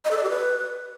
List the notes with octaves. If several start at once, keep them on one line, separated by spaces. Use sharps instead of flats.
D#5
A4
D5
G4
B4